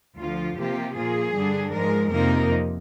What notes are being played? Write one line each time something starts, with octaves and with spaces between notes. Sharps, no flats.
D2 D3 F3 F4
C3 F3 A#3 F4 G4
A#2 F3 A#3 F4 G#4
G2 D3 G3 D4
G#2 F3 G#3 A#4
F2 C3 F3 A#3 D#4 A#4